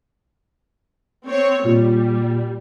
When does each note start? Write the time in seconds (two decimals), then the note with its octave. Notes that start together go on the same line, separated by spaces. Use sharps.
1.28 C4 C#5
1.64 A#2 G3